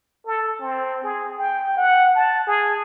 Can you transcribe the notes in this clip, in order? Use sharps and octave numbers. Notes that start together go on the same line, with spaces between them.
A4
C4
G#4
G5
F#5
A5
G#4